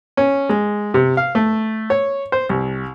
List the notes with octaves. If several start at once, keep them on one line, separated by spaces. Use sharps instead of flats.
C#4
G#3
C3
F5
A3
C#5
C5
C2